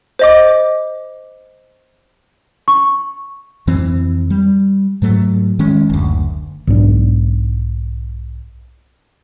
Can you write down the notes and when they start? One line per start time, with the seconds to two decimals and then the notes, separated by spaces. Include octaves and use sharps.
0.19 C5 D#5 D6
2.68 C#6
3.67 F2 E3 C4
4.30 G3
5.02 G#2 F#3 A3
5.59 D#3 G#3 C#4
5.90 F#1 D2
6.67 B1 G#2 D4